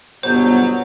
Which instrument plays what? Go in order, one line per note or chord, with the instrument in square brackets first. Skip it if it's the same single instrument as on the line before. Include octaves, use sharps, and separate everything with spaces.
[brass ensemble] G1 B2 F#3 [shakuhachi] B3 [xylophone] C5 G6